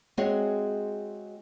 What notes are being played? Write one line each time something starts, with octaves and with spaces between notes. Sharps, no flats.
G#3 C4 F#4 G#4 C#5 E5